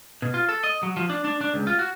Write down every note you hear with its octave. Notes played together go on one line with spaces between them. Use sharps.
B2
F4
A4
D#5
F#3
F3
D4
D4
D4
C#2
F4
F#4